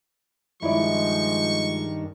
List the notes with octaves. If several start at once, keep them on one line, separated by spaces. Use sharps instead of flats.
G2 D#3 F3 G#3 E4 D5 C#6